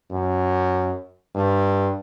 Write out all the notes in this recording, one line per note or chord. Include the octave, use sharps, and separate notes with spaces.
F#2
G2